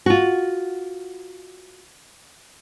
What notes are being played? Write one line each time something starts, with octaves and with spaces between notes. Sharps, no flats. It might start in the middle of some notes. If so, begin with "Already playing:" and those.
F4 F#4